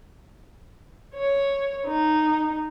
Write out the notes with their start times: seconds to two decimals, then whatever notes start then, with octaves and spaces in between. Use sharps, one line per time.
1.15 C#5
1.87 D#4